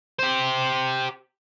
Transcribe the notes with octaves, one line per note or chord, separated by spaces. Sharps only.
G4 C5